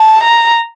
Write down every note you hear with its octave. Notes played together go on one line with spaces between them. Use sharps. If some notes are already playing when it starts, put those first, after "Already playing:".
Already playing: A5
A#5